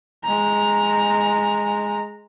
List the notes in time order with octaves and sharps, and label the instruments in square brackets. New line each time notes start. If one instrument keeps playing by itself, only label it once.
[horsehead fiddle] G#3 A#5